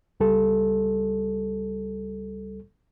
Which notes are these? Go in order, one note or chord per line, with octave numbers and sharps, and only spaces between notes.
C#2 G3 A4